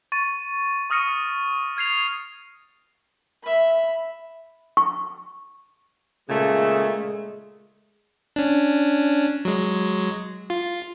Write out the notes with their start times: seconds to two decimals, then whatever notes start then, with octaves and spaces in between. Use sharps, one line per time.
0.12 C#6 A6 D#7
0.90 C#6 D#6 F6 A#6 C#7 D#7
1.77 F6 G#6 C7 F7
3.44 E5 B5
4.77 C#6
6.29 A#2 C#3 G#3 A3
8.36 C#4 D4
9.45 F#3 G#3
10.50 F4